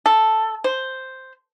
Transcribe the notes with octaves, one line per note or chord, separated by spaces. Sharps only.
A4
C5